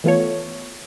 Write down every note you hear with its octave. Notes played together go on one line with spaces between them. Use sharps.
E3 A3 B3 F4 A4 C#5